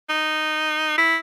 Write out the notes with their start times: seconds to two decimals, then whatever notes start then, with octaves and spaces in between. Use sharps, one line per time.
0.09 D#4
0.98 E4